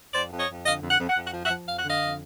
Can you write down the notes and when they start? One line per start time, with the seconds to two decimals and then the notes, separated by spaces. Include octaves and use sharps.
0.13 F2 C5 D5
0.31 F2
0.38 C#5 D#5
0.48 F2
0.64 D3 D#5 F5
0.81 F2
0.90 F#5
0.99 F2
1.08 F#5
1.16 F2
1.26 F#5
1.33 F3
1.44 E5 F#5
1.49 F3
1.66 F2 F5
1.78 F#5
1.84 D3 D#5 F5
2.00 F2